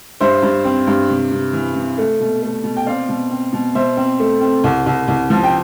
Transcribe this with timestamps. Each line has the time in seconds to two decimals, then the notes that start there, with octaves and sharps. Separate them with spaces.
0.21 G2 C5 E5
0.43 G2
0.65 C4
0.87 G2
1.09 C3
1.31 C3
1.53 E3
1.76 C3
1.98 A3
2.20 B2
2.42 A3
2.64 B2
2.77 G5
2.86 C4 D5 F5
3.09 B2
3.31 C4
3.53 B2
3.75 B2 C5 E5
3.97 C4
4.20 A3
4.41 C4
4.64 C2
4.86 C2
5.08 C2
5.30 F3
5.43 G5